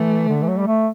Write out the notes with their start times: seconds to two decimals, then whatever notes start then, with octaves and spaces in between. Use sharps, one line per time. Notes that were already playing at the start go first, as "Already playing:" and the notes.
Already playing: E3 A3
0.28 D3
0.43 E3
0.48 F#3
0.59 G3
0.68 A3